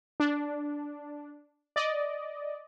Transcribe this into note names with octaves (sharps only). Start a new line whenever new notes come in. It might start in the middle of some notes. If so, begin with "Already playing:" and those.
D4
D5 D#5